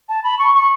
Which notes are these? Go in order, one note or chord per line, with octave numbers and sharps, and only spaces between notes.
A5
B5
C#6
C#6